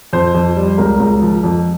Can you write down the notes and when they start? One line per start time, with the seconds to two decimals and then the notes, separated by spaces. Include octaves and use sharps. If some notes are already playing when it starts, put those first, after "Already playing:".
0.13 F2 C5
0.35 F2
0.57 G3
0.78 C#2 A#4
1.00 C#2
1.22 F3
1.43 F2